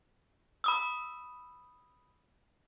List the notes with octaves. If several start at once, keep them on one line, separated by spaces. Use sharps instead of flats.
B5 D#6 E6